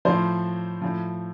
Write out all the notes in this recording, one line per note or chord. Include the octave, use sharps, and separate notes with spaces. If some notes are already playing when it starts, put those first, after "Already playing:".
A2 F3 C5
A2 F3